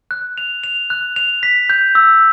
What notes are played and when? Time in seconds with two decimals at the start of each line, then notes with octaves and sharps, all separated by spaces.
0.11 F#6
0.38 F7
0.64 F7
0.90 F#6
1.16 F7
1.43 B6
1.70 G6
1.95 E6